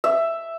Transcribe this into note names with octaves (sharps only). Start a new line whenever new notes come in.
E5